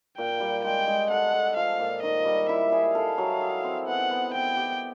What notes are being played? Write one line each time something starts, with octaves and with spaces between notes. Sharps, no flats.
A#2 G5
G3
G#3 G5
G#3
A4 F#5
A4
F3 F5
A#2
D#3 D#5
G3
E4 E5
G#4
A4 F5
F#3
G#4
C4
B3 F#5
B3
B3 G5
G4